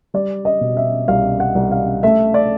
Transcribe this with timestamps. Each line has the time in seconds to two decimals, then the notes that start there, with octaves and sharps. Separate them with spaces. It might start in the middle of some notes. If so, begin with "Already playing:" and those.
0.14 G3 D5
0.45 D#5
0.61 B2
0.77 E5
1.08 C2 F5
1.40 F#5
1.55 C2
1.72 F5
2.03 A3 E5
2.34 D5